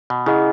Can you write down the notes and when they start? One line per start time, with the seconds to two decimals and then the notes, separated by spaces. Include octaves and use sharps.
0.10 B2
0.26 C#3 E4 G#4 D#5 F#5